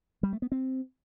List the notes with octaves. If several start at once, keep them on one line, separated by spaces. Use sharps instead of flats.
G3
A3
B3
C4